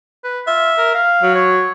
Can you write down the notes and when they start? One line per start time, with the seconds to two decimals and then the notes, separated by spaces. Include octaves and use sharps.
0.24 B4
0.47 F4 E5
0.78 A#4
0.94 F5
1.23 F#3
1.35 C#5